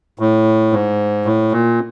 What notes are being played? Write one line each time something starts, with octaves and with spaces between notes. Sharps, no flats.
A2
G#2
A2
A#2